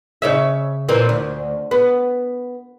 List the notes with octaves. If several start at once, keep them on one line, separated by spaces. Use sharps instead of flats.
C#3 C#5 E5
A#2 E3 C4
D2
B3